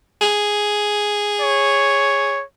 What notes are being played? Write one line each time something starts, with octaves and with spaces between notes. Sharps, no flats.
G#4
C#5